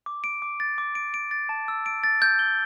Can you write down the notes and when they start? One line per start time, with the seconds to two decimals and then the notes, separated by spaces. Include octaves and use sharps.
0.06 D6
0.24 D7
0.42 D6
0.60 A6
0.78 D6
0.95 D7
1.14 D7
1.31 A6
1.49 A5
1.68 E6
1.86 D7
2.04 A6
2.22 G6
2.39 G7